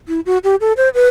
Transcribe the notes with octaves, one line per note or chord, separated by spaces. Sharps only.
E4
F#4
G4
A4
C5
B4